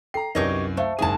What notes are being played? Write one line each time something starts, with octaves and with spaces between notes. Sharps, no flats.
A4 G5 A#5 C7
C2 F#2 D#4 G4 A#4 B4 C#5 D#5
A3 C5 E5 F5
F#1 G#2 G#4 G#5 A5